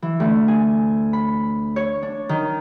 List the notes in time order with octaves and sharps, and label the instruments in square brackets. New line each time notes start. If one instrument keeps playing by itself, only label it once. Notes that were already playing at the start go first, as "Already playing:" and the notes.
[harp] E3
D2
G#5
B5
C#5
D4
D#3